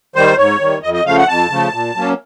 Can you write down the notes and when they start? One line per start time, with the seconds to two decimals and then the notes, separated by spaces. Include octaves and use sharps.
0.15 D#3 G3 C5
0.38 G#2 C#5
0.60 D#3 G3
0.83 F2 D#5
0.94 D#5
1.05 C#3 F3 A3 F5
1.17 F#5
1.28 F2 A5
1.50 C#3 F3 A3
1.73 A#2
1.96 F#3 A#3 C#4